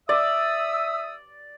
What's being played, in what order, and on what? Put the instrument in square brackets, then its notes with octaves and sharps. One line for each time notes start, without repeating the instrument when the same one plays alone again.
[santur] D5 [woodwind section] E5 D#6 E6